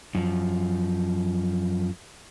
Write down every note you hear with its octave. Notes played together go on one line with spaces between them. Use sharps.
F#2 F3